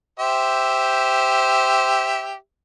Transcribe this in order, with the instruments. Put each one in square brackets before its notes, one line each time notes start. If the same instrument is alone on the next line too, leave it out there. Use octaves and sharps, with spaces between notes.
[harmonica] G4 C5 E5